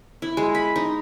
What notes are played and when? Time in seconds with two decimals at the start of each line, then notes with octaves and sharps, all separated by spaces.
0.22 E4
0.37 G#3
0.55 B5
0.76 D#4